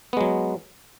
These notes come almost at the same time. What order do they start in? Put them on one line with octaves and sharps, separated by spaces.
B3 G#3 F#3